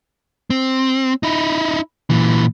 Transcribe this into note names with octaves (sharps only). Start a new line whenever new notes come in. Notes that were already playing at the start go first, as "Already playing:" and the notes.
C4
D#4 E4
A#2 E3